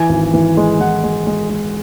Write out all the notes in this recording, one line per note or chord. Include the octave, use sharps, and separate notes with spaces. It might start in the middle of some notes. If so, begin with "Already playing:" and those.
Already playing: E3 G#5
G#1
E3
G#3
E3 F#5
G#3
G#3
G#3